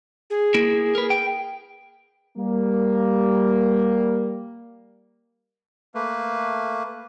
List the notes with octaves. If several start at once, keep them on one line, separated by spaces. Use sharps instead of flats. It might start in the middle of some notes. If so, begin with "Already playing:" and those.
G#4
A#3 E4
A#4 B4
G5
G3 A#3
A3 A#3 B4